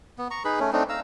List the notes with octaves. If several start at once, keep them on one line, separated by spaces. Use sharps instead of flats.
B3
A#5 C#6
D#4 G#4 B4 B5
A3 C#4
A3 C4 D4 D#4
F5 A#5 E6